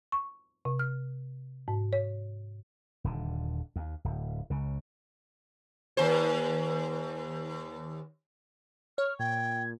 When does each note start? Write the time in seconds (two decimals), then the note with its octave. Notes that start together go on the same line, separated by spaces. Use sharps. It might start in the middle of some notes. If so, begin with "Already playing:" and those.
0.12 C#6
0.65 C3
0.79 F6
1.68 G#2
1.93 C#5
3.04 D#1 D3
3.76 D#2
4.05 D1
4.50 C#2 C#3
5.97 D#2 C5
8.98 C#5 F6
9.19 A#2 G5 G#6